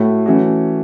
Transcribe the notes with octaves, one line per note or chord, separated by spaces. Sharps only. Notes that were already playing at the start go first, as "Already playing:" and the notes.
Already playing: A2 A3 F#4
E3 A3 C#4 F#4